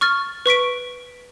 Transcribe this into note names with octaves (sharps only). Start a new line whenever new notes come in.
C#6 F6 A6
B4 C#6 B6 D7